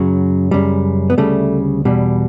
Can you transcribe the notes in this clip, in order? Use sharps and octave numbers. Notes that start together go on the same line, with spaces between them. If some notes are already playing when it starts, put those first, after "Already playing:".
Already playing: F#2 C#3 F#3
F#2 C#3 G3
B3
D2 C#3 G3 A3
E2 B2 G3